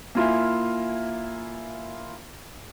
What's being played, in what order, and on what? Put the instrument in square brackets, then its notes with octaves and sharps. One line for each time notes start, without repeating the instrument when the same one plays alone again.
[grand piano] A#3 E4 F4 E5 G#5